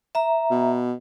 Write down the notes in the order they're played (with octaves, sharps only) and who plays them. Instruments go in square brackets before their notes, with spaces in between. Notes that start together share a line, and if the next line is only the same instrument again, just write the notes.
[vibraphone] E5 A#5
[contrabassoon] B2